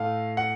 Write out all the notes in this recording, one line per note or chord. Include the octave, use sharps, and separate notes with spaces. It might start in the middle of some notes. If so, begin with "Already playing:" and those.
Already playing: A2 A3 F5
F#5